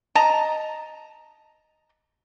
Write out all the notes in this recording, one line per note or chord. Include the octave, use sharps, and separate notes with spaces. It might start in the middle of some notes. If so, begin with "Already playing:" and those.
D#5 A5 A#5